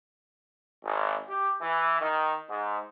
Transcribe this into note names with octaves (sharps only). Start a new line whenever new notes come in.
G#1
G4
E3
D#3
G#2